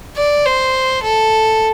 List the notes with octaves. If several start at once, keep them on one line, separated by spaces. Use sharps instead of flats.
D5
C5
A4